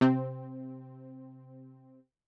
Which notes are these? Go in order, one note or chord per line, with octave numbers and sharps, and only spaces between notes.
C3 C4